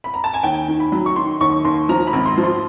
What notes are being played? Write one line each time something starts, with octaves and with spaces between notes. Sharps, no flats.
B5
A#5
A5
G#5
D#2 G5
D#3
B5
F#3
C#6
D#3 C6
D#2 C#6
D#2 C6
F3 A#5
B5
G#1
C6
F3
C6